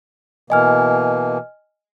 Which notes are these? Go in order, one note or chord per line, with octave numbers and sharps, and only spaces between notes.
B2 E3 A#3 D#5 G#5 F6